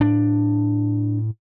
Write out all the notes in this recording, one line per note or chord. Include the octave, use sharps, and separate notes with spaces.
A2 D4